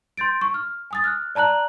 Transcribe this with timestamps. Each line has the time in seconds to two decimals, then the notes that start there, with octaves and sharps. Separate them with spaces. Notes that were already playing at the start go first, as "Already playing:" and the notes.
0.17 C6 G6 A6 D7
0.41 C#6
0.54 F6
0.91 G#5 D#6 A6
1.04 F6 F#6
1.35 D5 A5 A#5 F#6 F#7